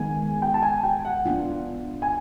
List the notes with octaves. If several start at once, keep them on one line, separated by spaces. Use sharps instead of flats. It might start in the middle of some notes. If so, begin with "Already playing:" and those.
Already playing: D#3 G#3 B3 G#5
G5
A5
G#5
G5
F#5
B3 D4 F4
G#5